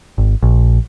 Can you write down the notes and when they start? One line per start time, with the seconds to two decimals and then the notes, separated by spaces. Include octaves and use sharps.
0.18 G#1
0.43 A#1